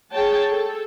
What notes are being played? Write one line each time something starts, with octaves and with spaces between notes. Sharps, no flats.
G#4 C#5 G5 A5
A4